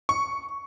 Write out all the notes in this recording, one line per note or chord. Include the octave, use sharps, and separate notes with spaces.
C#6